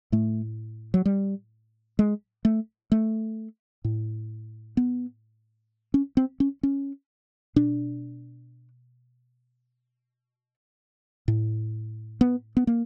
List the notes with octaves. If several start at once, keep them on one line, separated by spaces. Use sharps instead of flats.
A2 A3
F#3
G3
G#3
A3
A3
A2
B3
C#4
C4
C#4
C#4
B2 D4
A2
B3
B3
A#3